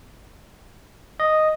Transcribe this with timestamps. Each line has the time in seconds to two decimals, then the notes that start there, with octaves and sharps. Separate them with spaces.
1.20 D#5